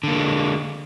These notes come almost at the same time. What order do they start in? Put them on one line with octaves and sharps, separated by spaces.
D3 A#3 G#3